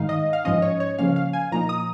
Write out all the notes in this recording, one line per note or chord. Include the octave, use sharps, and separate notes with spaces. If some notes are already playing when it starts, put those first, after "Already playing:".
Already playing: G#2 D#3 G#3 D#4 F5
D#5
F5
G#2 F3 G#3 C#4 D#5
C#5
C#5
C#3 F3 A#3 C#4 F5
F5
G#5
A#2 F3 A#3 D#4 A#5
D#6